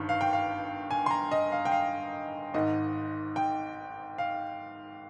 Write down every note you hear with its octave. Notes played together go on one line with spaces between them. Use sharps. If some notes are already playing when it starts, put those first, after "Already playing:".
Already playing: G1 G2 D#3
F5
G5
F5
G#5
C6
A#5
D#5
F5
G5
F5
G#1 G#2 D#3 D#5
G5
F5